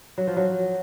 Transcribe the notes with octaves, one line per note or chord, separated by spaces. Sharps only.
F#3
F3
F#3